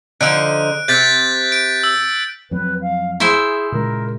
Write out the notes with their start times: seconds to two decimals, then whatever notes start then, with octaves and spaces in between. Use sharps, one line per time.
0.21 D3 F3 D#4 F#6 D7
0.88 C3 G6 A6 B6
1.52 D7
1.83 E6
2.51 F2 F#3 C4 B4
2.82 F5
3.20 E4 G#4 C5 E5
3.72 A#2 C#3 G#3 A#4